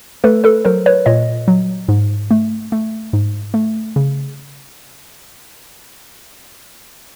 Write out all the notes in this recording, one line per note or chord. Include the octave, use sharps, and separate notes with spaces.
A3 A4 B4
A4 B4
F#3 A#4 C5
B4 C#5
A#2 C#5 D#5
F#3
G#2
A3
A3
G#2
A3
C#3